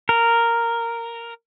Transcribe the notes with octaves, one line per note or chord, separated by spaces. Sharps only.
A#4